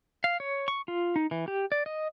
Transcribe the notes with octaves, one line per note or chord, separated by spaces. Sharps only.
F5
C#5
C#6
F4
D#4
E3
G4
D5
D#5